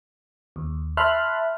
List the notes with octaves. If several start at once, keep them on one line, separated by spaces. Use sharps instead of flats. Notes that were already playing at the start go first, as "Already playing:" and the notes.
D#2
E5 A5 B5 C6 F6 F#6